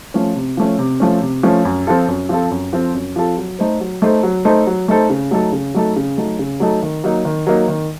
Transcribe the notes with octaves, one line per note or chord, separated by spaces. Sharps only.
F3 A3 C#4
C3
F3 A3 C#4
C3
F3 A3 C#4
C3
F3 A3 C#4
F#2
F3 C4 F4 A4
F#2
F3 C4 F4 A4
F#2
F3 C4 F4 A4
F#2
F3 C4 F4 A4
F#3
A3 D#4 A4 C5
F#3
A3 D#4 A4 C5
F#3
A3 D#4 A4 C5
F#3
A3 D#4 A4 C5
C#3
F#3 A3 D#4 A4
C#3
F#3 A3 D#4 A4
C#3
F#3 A3 D#4 A4
C#3
F#3 A3 D#4 A4
D#3
F#3 A#3 D#4
D#3
F#3 A#3 D#4
D#3